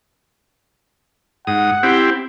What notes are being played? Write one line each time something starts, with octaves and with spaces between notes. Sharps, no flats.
G#2 F#5 D#6
C4 E4 G4